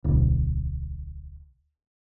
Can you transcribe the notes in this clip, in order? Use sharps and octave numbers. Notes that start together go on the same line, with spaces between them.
D1 B1